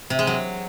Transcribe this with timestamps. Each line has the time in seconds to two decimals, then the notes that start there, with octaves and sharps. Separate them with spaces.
0.10 C3
0.19 G#3
0.27 F#3